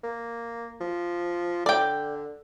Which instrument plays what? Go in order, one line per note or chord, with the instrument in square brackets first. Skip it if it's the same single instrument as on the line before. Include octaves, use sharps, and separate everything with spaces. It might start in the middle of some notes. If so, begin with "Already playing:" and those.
[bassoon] A#3
F3
[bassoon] D3 [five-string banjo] D5 G5